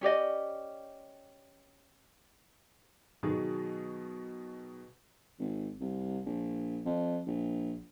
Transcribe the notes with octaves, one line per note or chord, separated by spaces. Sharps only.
C#4 G4 D5 D#5
B2 D#3 F#3 G#4
G#1
C2
A#1
F2
A#1